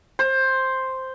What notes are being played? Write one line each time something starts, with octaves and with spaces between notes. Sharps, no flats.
C5